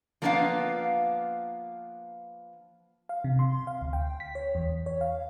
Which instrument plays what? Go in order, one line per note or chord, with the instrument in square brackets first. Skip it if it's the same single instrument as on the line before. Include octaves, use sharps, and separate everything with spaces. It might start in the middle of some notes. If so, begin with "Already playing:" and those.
[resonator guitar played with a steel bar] F3 A#3 B3 D4 F4 F5
[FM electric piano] F5
C3
C6
F5
D2
G5
B6
C#5
E2
C#5
F5